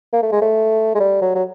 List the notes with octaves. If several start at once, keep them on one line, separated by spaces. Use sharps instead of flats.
A#3
A3
G#3
A3
G#3
G3
F#3
F#3